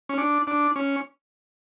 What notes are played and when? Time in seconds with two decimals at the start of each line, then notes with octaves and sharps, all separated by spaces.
0.09 C#4
0.18 D4
0.47 D4
0.76 C#4